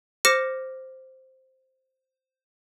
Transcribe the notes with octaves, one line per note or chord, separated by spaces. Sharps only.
C5 D6 F6 A#6 C#7 E7